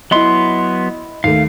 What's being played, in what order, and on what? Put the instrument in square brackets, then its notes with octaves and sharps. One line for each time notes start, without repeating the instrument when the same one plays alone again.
[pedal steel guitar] F#3 B3 C6 [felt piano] E4 D#5
[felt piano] D#2 A3 [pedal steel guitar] F5